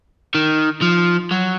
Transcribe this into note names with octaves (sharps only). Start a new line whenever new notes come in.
D#3
F3
F#3